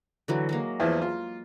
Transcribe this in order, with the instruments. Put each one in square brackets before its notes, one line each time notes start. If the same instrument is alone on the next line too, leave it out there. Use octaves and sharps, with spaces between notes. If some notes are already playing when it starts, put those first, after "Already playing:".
[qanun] D3 E3 F#3
F#3 G#3 A#3
[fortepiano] E2 E3 F3
F4